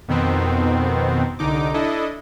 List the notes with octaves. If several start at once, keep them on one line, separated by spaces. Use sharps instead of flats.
F2 B2 D#3 B3 C4
C2 D3 D#4 D6
D4 E4 A4 D#5